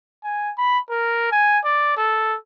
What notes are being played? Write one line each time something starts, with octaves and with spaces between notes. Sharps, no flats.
G#5
B5
A#4
G#5
D5
A4